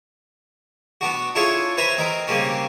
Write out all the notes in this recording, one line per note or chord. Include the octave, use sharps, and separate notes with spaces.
B3 D4 F#4
D4 E4 F4 G#4 A4 C#5
B4 C5 E5 G#5 A#5 B5
C4 D#4 A#4
C#3 G3 A#3 C4 C#4